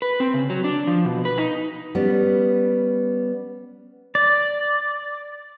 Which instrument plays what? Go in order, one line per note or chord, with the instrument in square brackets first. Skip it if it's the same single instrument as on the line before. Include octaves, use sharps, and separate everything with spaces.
[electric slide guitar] B4
C4
C#3
F#3
D4
F3
B2
B4
D#4
[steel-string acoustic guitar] G3 B3 C#4
[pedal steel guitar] D5